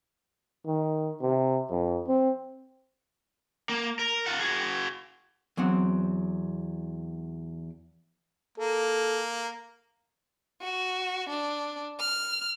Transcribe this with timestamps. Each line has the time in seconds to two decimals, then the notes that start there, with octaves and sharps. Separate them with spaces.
0.67 D#3
1.21 C3
1.70 F2
2.08 C4
3.69 A#3
3.99 A#4
4.26 F4 F#5
4.39 F#4 G#4
5.57 E2 F#3 C4 F#5
8.58 A#3 A4
10.62 F#4
11.30 D4
12.00 F6